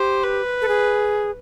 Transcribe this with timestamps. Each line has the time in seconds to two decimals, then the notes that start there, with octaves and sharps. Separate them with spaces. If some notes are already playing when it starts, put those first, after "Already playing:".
Already playing: G4 C5
0.23 B4
0.61 A4
0.68 G#4